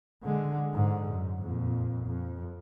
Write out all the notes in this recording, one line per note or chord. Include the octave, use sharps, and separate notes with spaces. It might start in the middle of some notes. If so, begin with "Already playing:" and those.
D3 G#3
G#2 D3
F#2
F2 A#2
F2